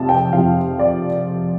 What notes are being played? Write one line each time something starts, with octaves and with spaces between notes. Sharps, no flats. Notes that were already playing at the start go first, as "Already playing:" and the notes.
Already playing: F2 C3 F3 F5 A5
G5
F2 C3 F3 F5
D5